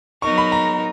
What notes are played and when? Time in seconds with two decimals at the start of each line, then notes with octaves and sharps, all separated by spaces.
0.22 F#3 B3 D#4 A#4 C#6
0.38 B5
0.52 A#5